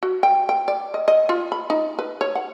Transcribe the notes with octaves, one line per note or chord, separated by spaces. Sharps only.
F#4
G5
G5
D5
D#5
D#5
F4
B5
D#4
B4
C#5
F#5